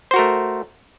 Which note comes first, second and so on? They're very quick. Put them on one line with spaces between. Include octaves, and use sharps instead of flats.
C5 F#4 A#4 A3